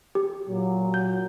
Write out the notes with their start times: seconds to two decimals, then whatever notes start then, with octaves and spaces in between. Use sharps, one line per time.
0.15 G4
0.48 A#2 F#3
0.94 G6